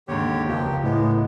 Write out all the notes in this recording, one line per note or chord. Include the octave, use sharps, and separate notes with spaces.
D#2 G#2 D3 G4 C#5
F1 C#2 A#2 F3 G4
A2 G#3 B3